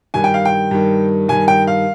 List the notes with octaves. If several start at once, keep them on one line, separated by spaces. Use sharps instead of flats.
G2 D#3 G#5
G5
F5
G5
G2 D#3
G2 D#3 G#5
G5
F5